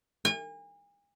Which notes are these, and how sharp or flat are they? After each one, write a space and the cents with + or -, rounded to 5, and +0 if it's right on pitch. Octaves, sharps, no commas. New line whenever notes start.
G#5 -40